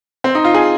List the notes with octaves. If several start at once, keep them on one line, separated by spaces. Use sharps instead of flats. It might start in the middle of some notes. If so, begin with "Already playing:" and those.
C4
D#4
F4
G#4